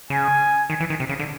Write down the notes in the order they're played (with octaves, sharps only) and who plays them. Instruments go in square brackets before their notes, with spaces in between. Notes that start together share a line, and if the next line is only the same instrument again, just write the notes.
[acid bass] C#3 [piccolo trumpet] G#5
[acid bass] D#3
E3
D#3
C3
C#3
D3